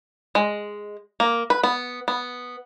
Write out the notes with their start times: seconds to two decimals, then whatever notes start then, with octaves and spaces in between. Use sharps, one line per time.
0.35 G#3
1.20 A#3
1.50 B4
1.63 B3
2.08 B3